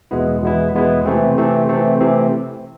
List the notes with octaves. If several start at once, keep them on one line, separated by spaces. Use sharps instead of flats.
E2 B2 G#3 B3 E4
E2 B2 G#3 B3 E4
E2 B2 G#3 B3 E4
C3 E3 A3 C4
C3 E3 A3 C4
C3 E3 A3 C4
C3 E3 A3 C4